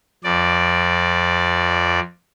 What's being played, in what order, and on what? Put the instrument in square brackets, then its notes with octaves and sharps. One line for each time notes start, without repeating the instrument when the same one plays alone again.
[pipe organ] F2 D5